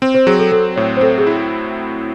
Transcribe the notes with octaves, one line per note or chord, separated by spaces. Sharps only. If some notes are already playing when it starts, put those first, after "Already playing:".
C4 C5
C5
F#3 G#4
A4
F#3 A4
A2 C#5
C5
C4 A4
G#4
E4